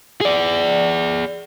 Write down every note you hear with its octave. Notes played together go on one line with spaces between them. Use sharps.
G#4 D5